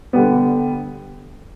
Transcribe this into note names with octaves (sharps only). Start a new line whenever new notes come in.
D3 G3 B3